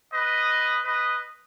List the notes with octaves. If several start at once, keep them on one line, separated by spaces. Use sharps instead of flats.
B4 D#5
B4 D#5